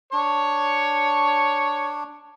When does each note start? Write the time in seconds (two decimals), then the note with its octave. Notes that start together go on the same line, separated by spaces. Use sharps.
0.13 D4 C#5 C#6